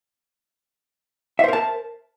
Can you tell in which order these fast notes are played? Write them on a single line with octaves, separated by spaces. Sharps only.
E5 C5 A#4 A5